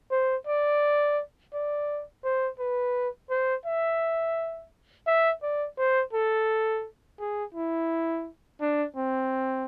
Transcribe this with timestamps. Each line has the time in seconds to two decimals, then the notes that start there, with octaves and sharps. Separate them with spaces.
0.11 C5
0.47 D5
1.54 D5
2.24 C5
2.59 B4
3.30 C5
3.66 E5
5.07 E5
5.42 D5
5.78 C5
6.13 A4
7.20 G#4
7.54 E4
8.61 D4
8.96 C4